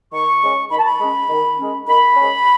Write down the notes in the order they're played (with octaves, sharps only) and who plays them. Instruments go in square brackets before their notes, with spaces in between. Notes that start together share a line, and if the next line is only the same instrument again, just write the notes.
[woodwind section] D#3 C#6
G#3 C#4
D#3 B5
A5
B5
G#3 C#4
D#3
G#3 C#4
D#3 B5
G#3 C#4